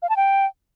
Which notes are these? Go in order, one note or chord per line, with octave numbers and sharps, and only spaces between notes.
F5
A5
G5